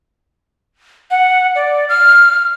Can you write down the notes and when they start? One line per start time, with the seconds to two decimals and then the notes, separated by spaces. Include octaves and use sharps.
1.11 F#5
1.56 D5
1.89 F6